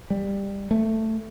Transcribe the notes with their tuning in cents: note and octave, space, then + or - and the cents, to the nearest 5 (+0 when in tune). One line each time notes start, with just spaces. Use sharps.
G3 +15
A3 +10